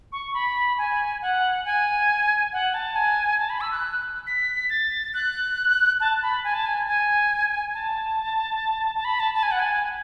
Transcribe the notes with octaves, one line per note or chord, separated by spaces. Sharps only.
C#6
B5
G#5
F#5
G#5
F#5
A5
G#5
A5
B5
E6
F#6
B6
A6
F#6
A5
B5
G#5
A5
G#5
G#5
A5
A5
B5
A5
A5
G#5
F#5
G#5